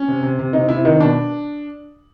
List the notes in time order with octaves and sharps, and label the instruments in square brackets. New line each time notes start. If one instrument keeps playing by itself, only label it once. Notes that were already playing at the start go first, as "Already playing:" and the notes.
Already playing: [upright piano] C#4
C3
C3
C3
C3 D#4
C3 E4
D#3 D#4
B2 D4